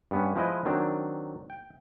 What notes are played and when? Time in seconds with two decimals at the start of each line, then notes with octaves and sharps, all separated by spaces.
0.11 G2 B3 C#4
0.36 F3 G#3 E4 B4 D#5
0.65 D#3 F#3 C4 D4
1.50 G5